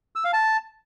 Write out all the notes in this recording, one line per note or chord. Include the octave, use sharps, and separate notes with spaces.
E6
F5
A5